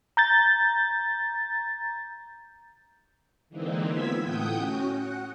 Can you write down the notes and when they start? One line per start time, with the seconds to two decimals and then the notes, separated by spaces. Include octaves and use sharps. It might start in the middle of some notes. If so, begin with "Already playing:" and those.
0.17 A#5 G6 A6
3.49 D3 E3 G#3 A#3 C4 D#4
3.87 B3 F4 E6 G#6 B6
4.22 A2 A3 F#5 G5 D#6 G6
4.53 C#4 F#4
4.94 F#5